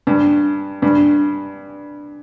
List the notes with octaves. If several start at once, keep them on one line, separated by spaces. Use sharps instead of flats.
G2
G2